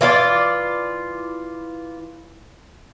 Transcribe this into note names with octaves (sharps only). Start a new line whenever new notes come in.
E3 F4 G4 D5